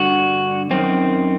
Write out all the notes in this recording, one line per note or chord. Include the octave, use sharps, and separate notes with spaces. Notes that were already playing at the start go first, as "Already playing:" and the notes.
Already playing: G2 D3 F#4
F#2 D#3 C4